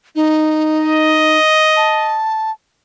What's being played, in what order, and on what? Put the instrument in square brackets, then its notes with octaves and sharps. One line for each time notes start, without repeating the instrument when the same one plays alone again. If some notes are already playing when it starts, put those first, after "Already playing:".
[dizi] D#4
[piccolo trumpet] D#5
[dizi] A5